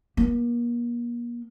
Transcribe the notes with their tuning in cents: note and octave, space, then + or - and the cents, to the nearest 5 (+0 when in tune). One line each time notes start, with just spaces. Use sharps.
A#3 +35